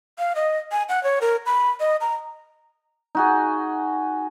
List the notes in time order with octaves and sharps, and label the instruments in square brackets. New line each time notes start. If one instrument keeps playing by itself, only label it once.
[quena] F5
D#5
G#5
F#5
C#5
A#4
B5
D#5
A#5
[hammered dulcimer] D#4 F#4 G#4